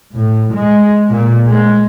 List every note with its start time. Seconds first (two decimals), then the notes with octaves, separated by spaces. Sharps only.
0.15 A2
0.54 G#3
1.10 A#2
1.48 G#3